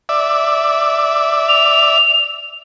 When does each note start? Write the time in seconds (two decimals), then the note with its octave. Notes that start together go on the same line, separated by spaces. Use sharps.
0.09 D5 E5
1.49 F7